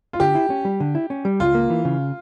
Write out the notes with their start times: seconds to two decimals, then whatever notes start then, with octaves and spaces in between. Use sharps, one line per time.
0.13 F4
0.20 D3 G4
0.35 E4
0.50 C#4
0.65 G3
0.80 D3
0.95 E4
1.10 C#4
1.25 G3
1.40 C#2 F4
1.55 A#3
1.70 E3
1.85 C#3